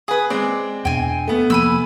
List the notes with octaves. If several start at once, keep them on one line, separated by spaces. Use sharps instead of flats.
G#4 B4 D#6
G#3 C4 D5
E2 B2 D4 G5 G#5
A3 B3
F1 F3 A#3 G#5 B5 E6